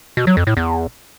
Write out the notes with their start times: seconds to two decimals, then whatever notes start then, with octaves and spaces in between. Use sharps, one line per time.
0.17 B2
0.27 F#3
0.37 F2
0.47 A2
0.57 E2